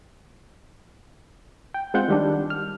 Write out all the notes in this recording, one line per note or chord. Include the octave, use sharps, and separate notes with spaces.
G5
G#3 C4 F4 F#5 G6
D#3 G3 D4
F6